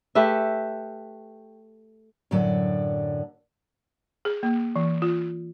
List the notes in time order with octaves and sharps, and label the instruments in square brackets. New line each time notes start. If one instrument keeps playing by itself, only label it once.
[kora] A3 G4 B4 E5
[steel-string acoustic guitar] F#2 A2 D3 F#3 D5
[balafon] G#4
A#3
E3
F4